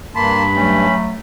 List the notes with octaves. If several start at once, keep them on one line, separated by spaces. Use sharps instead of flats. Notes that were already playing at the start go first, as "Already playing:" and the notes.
G2 A#3 A5 B5 C6
F#3 A3 C#4